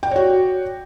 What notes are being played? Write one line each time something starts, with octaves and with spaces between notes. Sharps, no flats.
F#4 C#5 D5 G5